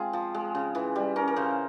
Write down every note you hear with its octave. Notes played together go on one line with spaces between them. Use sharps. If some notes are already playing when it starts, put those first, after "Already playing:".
Already playing: G#3 C4 F4 G#4
F3
G#3
C#3
E3
G3
C#4 A#4
A#4
C#3 C5